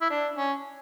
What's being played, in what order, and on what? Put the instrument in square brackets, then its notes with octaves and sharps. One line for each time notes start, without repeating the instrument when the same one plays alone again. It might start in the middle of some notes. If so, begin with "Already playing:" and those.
[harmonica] E4
D4
C#4